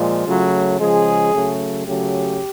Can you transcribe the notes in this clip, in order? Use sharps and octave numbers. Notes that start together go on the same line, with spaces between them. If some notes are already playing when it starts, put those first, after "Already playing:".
Already playing: A#2 F3 G#3 F4
C#3 F#3 A3
C#3 F3 G#3 G#4
C#3 F#3 A3
C#3 F#3 A3 G4